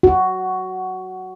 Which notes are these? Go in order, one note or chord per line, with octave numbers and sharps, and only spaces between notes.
F#4